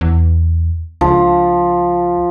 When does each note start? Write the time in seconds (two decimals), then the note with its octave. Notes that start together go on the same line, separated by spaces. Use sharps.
0.01 E2
1.01 C#2 F3